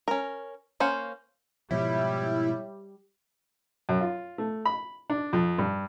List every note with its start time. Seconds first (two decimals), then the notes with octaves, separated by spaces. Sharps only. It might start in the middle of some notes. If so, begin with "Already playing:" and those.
0.08 C#4 A#4
0.80 A#3 C#4 C5 F#5
1.71 G#2 B2 F3 G3 E4 C#5 E5
3.89 F#2
4.01 F4
4.38 A3
4.65 B5
5.10 D4
5.33 F2
5.58 G2